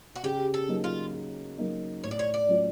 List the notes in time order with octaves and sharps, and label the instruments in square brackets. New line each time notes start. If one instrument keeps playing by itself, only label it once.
[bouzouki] F#4
[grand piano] C#3 [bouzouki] G4
[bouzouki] A4
[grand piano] F#3 A#3 D#4
[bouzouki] F4
[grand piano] C#3
F#3 A#3 D#4
[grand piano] A2 [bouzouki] C#5
[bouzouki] D5
C#5
D5
[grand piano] F#3 A3 C#4 F4